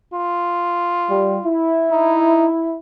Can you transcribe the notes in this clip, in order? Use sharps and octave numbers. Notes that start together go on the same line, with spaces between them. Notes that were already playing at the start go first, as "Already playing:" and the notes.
F4
G3
E4
D#4